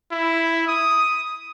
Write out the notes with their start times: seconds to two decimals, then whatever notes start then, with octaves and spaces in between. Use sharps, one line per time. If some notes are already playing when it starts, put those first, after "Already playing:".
0.12 E4
0.68 D#6